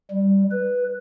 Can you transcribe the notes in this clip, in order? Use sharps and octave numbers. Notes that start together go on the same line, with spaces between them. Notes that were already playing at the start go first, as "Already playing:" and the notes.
G3
B4